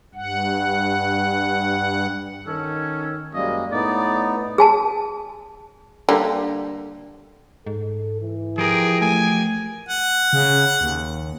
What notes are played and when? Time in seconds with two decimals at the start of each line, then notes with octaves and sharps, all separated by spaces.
0.15 G2 F#5
2.47 D#3 C#4 A4
3.34 F#2 G3 G#3 A#3 D#5
3.72 A2 B3 D#4 D5
4.58 G#4 G#5 A5
6.09 D3 G3 A#3
7.67 G#2 A4
8.22 E3
8.58 F3 G4 G#4 A#4
9.01 A3 G#5
9.89 F#5
10.33 C#3
10.81 D#2